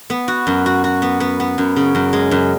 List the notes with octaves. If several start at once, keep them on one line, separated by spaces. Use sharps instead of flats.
B3
F#4
F#2
F#4
F#4
B3
B3
B3
F#2
C#3
F#2
G#3
F#2